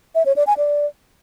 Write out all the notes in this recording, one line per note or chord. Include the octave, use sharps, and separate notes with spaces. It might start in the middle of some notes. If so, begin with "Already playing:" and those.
E5
C#5
D5
G#5
D5